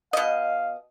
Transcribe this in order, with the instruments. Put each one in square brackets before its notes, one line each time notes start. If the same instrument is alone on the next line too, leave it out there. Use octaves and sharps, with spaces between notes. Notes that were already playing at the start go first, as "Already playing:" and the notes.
[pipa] B2 D#5 [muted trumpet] F5